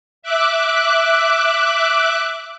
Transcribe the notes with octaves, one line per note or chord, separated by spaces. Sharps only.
E5 D6 F#6